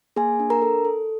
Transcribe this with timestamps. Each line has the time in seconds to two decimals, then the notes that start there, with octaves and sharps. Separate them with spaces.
0.16 A#3 G#4 G#5
0.40 D4
0.50 A#4 A#5
0.62 A4
0.85 A4